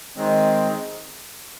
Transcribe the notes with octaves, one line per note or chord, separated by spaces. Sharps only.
D#3 G#3 C4